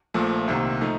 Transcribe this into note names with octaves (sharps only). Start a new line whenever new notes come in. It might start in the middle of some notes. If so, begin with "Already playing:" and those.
A#1 A#2 F3 A3
C2 C3 D#3 A#3
F3 A3 D#4